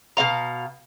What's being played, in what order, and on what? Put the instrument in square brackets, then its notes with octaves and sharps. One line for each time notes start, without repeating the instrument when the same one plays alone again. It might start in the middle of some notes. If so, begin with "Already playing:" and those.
[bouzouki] B2 A#3 F5 A#5